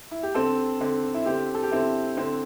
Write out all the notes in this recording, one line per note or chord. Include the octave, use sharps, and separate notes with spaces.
E4
G4
D3 C4 A4
D3 C4
E4
D3 C4 G4
A4
G4
D3 C4 E4
D3 C4